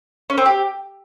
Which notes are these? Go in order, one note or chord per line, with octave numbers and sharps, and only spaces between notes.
C#4
C4
G4